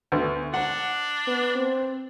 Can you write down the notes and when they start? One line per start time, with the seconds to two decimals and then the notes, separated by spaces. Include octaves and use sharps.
0.12 D2 B3
0.54 D4 F#5
1.27 B3
1.56 C4